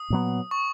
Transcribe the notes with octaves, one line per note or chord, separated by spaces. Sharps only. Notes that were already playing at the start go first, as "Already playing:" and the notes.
Already playing: D#6
A#2 F#3 B3
C#6